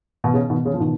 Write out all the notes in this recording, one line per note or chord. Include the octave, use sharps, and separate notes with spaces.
B2
C#3
B2 D#3
C#3
F3
B2 D#3